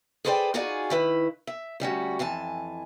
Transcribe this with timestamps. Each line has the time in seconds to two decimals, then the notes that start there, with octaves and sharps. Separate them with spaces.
0.25 G#4 A4 B4 C5 D5 G5
0.54 D#4 F4 F#4 G#4 D5 G#5
0.90 D#3 E4 B4
1.47 E5
1.80 D2 G3 C#4 F#4
2.19 F2 E3 G#5 A5